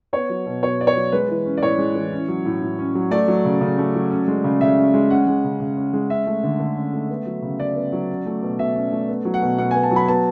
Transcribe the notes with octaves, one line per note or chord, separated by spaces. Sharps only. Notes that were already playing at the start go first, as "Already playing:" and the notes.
B3 C#5
F#3
B2
B2 C#5
B3 D5
C#5
F#3
G#3 B4
E3
C#4
D5
A2 C#5
G#3
E3
C#4
F#3
A2
A2
C#4
F#3
A3 D5
F#3
C#3
C#3
A3
F#3
C#4
G#3
C#3
C#3 E5
C#4
G#3
C#4 F#5
G#3
C#3
C#3
C#4
G#3
C#4 E5
A3
D3
D3
C#4
A3
B3
F#3
C#3
C#3 D5
B3
F#3
C#4
A3
B2
B2 E5
C#4
A3
B3
F#3
F#5
B2
B2 F#5
B3 G#5
A5
F#3
B5
B3 A5